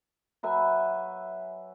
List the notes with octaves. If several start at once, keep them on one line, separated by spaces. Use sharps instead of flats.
F#3 B4 E5 G#5